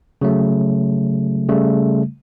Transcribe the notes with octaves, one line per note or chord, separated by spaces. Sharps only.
C#3 F#3 A3
C#3 G3 A3